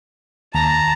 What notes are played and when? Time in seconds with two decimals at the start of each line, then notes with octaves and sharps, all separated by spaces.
0.55 D#2 A5 A#5 A#6